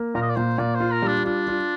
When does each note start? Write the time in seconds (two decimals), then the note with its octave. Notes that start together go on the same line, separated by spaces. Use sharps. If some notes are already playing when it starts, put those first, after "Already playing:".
Already playing: A#3
0.15 A#2 A#4
0.22 D#5
0.29 D5
0.36 A#2 C5
0.58 A#2 D5
0.75 C5
0.80 F4
0.92 A#4
1.02 G3
1.08 D4
1.25 D4 F4
1.48 F4